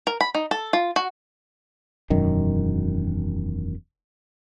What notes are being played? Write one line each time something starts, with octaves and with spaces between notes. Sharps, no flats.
A#4
B5
D#4
A4
F4
F#4
E1 F#2 D#3